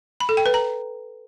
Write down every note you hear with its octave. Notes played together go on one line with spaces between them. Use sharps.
B5
A4
G5
B4
A#5